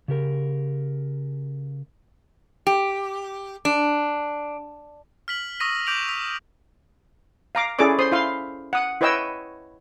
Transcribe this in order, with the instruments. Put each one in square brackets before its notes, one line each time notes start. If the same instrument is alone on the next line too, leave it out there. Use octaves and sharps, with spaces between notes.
[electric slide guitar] C#3 G4 A#4
[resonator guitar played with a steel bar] G4
D4
[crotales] F6 B6 F#7
C#6 D#6 E6 A#6 B6 D#7
D6 G6 D7 F7 F#7
E6 B6 F7
[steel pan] F5 A#5 D6
C#4 E4 G#4 A4 D5 D6
C5 C6 D#6
E4 F5 C6
F#5 D#6
E4 B4 C#5 D#5 G5 E6